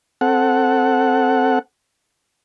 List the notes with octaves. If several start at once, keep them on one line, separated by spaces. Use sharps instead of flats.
C4 A4 F#5